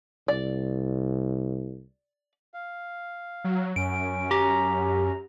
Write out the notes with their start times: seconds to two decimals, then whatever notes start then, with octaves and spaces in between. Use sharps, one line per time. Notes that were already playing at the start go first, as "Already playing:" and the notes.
0.28 C2 D5
2.54 F5
3.44 F#3
3.76 F#2 C#4 D7
4.31 G4 A#5